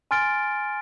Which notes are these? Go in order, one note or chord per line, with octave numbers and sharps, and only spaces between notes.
G#5 C6 F6 A6 D7 G7